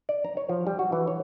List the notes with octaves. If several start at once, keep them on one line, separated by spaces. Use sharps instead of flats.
D5
A#5
C#5
F3
G3
F#4
E3
C#5